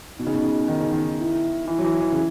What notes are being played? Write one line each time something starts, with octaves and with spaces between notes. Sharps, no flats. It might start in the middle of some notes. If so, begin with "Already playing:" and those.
B2 D#4
C#3
B2
C#3
D#3
C#3
D#3
E4
E3 E4
F#3
E3
E3
C#3